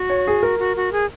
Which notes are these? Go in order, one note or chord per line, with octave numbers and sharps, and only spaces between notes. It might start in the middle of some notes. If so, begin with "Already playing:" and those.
Already playing: F#4
C#5
G#4
A#4
F#4
F#4
G#4